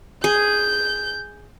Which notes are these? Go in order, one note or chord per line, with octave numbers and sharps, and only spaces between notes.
G#4 G6